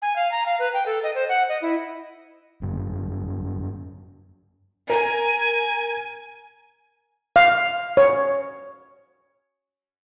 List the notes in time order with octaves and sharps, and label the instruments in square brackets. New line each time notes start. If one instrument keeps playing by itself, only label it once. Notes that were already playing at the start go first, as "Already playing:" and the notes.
[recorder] G#5
F5
A#5
F5
B4
G5
A4
D#5
C5
F#5
D#5
E4
[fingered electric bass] G1 F#2
[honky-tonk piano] A#4 [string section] G#5
[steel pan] F5
C#5